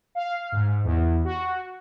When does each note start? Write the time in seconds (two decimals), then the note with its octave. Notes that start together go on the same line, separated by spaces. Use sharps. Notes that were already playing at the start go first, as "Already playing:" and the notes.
0.15 F5
0.52 G#2
0.84 E2
1.25 F#4